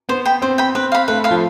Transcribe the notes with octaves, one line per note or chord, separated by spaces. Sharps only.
B3 C5
G5 B5
C4 C5
G5 B5
C4 B4
F5 B5
A3 B4
F5 B5
F3